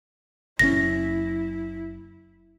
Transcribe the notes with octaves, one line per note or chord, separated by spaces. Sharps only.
F#1 C#3 C#4 E4 A#6